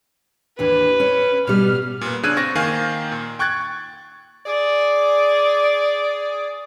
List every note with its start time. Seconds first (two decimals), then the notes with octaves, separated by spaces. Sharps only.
0.59 D#2 E3 D4 B4
1.00 C#4
1.47 B2 G3 F6
2.01 A#2 B3
2.23 C#3 D4 E6 F#6 G#6 D#7
2.37 C4 C#6 A6 A#6
2.55 D#3 A#3 F5 G#5
3.12 A#2
3.39 G5 C#6 F#6 G#6 A6
4.46 G#4 D5